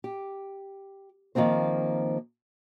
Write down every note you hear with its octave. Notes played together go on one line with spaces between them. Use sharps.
G4
D#3 F3 A#3 C4 C5